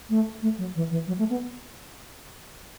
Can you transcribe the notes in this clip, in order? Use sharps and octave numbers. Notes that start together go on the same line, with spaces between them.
A3
A3
F#3
E3
E3
F#3
A3
B3